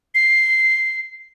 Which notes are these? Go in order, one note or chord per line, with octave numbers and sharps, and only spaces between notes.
C7